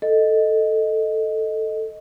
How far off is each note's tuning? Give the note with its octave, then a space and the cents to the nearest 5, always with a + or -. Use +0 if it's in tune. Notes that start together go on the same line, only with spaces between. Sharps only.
A4 +0 D#5 +0